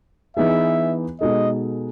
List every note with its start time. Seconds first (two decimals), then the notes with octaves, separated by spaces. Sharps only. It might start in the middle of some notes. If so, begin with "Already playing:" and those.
0.37 E3 B3 D#4 G#4 E5
1.21 B2 G#3 D#4 A4 D#5